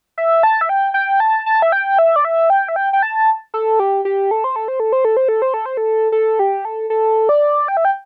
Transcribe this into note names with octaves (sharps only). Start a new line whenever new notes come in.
E5
A5
E5
G5
G5
A5
A5
E5
G5
E5
D5
E5
G5
E5
G5
G5
A5
A4
G4
G4
A4
C5
A4
C5
A4
C5
A4
C5
A4
C5
A4
C5
A4
A4
G4
A4
A4
D5
G5
E5
G5